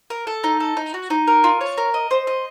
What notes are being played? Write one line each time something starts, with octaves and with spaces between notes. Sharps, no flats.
A#4
A4
D#4
A4
D#4
F#4
D#4
A#4
F4
C#5
A#4
D#5
C5
D#5